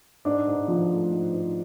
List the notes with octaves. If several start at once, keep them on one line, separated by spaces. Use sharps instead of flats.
G#2 D4
G#2
F3
A3
G#2
G#2